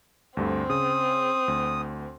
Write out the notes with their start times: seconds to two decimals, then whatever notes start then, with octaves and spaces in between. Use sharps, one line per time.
0.37 D2 G2 D3 C4
0.70 C#3 D#6
1.48 D2